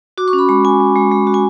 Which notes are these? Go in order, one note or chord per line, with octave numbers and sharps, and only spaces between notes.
F#4 D6
C#6
C#4
B5
G#3 B5
G#3 G#5
G#3
G#3
G#3
F#4
G#5